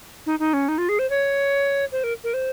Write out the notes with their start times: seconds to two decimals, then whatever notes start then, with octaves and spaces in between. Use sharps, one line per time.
0.26 D#4
0.39 D#4
0.53 C#4
0.68 D#4
0.78 F4
0.89 G#4
0.99 C5
1.10 C#5
1.92 C5
2.04 A#4
2.24 A#4
2.34 C5